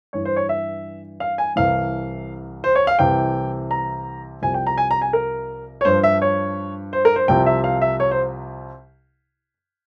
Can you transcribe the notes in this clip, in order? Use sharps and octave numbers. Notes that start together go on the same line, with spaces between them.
G2 E3 C#5
C5
C#5
E5
F5
G#5
C2 C3 E3 F5
C5
C#5
F5
C2 C3 E3 G5
A#5
C2 C3 F3 G#5
G5
A#5
G#5
A#5
G#5
A#4
C#5
G2 F3 C5
E5
C#5
C5
A#4
C5
C2 C3 F3 G5
E5
F5
E5
C#5
C5